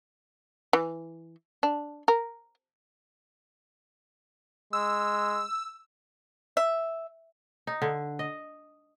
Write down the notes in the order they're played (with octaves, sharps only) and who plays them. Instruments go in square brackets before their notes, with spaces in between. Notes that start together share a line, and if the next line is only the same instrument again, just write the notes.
[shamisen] E3
D4
A#4
[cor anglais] G#3 [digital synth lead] E6
[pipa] E5
[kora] D#4
D3
D#5